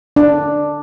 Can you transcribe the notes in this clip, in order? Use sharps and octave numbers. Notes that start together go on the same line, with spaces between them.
D4